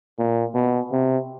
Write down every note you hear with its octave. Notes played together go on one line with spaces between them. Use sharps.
A#2
B2
C3